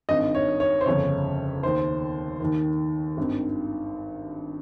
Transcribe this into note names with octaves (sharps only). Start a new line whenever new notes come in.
G#1 G2 D#3 D#5
C#5
C#5
C5
G1 F2 C#3 C#5
D#2 D#3 C5
D#2 D#3
G#1 G2 D#3